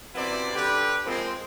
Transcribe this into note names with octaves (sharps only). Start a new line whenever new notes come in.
F#2 C3 B3 C4 E4 D5
D3 G4 B4
F3 G#3 A#3 C4